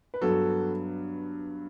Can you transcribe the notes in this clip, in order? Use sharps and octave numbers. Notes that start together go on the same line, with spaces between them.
B4
G2 F#3 B3 F#4 A4